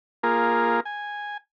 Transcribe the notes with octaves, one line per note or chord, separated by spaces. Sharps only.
A#3 F4 G#4 A#4
G#5